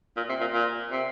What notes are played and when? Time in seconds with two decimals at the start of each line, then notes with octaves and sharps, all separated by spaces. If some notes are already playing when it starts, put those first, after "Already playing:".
0.17 A#2
0.29 C3
0.41 A#2
0.53 A#2
0.91 C3